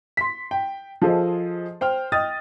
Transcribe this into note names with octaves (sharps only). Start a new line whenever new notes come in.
C6 B6
G5
F3 F4 G#4 A4 C5 D#5
C5 G5 F6
D#5 G5 D#6 A6